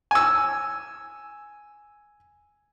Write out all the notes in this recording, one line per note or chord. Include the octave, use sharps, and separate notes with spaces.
G#5 E6